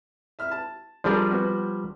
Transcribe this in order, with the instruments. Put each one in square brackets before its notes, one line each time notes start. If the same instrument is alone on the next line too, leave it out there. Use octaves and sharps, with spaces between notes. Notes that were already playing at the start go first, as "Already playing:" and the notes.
[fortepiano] E5 F6
A5
[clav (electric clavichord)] F3 G3 [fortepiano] D4 G#4 A#4
[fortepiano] B3 F#4